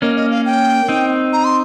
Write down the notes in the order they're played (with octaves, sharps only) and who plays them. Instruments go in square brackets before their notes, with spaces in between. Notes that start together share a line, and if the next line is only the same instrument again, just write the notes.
[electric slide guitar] A#3 C#4 [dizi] D#5
[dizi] D#5
F5
G5
[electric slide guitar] C4 D#4
[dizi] A#5
C6